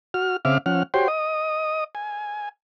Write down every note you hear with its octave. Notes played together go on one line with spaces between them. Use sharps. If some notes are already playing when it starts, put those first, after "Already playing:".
F#4 F6
C#3 C4 E5 F5 D6 F6
F3 C#4 F#5 F6
F#4 G4 C5 C#5 G5 C6
D#5 D#6
G#5